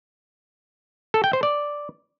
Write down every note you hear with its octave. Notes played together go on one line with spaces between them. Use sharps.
A4
G5
C5
D5